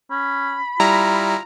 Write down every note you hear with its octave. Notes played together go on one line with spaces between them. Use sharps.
C#4 B5
G3 E4 F4 A#5